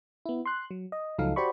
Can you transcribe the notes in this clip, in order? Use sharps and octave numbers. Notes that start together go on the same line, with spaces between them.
B3 E4
C6 F#6
F#3
D#5
C#2 F3 F#3 D#4 A4 F5
F#4 G4 C5 D5 B5 C#6